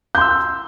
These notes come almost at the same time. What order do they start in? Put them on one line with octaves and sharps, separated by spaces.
G6 C6 E6